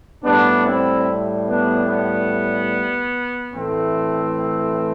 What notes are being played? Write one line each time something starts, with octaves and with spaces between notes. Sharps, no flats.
A2 G3 B3 D4
C4 E4
B3 D4
B3
A2 E3 A3 C4